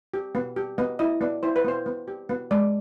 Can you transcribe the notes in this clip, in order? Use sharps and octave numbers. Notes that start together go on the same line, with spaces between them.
G4
B3
G4
B3 D#5
E4 D#5
B3 D5
E4 C5
B4
B3 C5
B3
G4
B3
G#3 D5